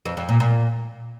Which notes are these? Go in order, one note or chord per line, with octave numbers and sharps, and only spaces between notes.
F2
F2
A#2
A#2